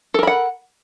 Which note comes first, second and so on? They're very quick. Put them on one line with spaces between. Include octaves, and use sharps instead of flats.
A4 A#4 B5 F#5